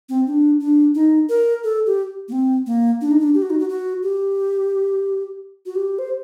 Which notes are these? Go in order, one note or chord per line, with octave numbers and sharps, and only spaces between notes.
C4
D4
D4
D#4
A#4
A4
G4
A#3
C4
A#3
D4
D#4
D4
G4
F#4
D#4
F#4
F#4
G4
F#4
G4
C5